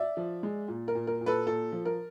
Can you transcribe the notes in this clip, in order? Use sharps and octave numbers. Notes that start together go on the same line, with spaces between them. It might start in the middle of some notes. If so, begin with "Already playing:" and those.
Already playing: D5 E5
F3
G#3
A#2
A#4
A#2
A#4
A#2
A4 B4
A#2 A4
F3
A#4